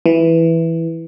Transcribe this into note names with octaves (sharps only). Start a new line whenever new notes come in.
E3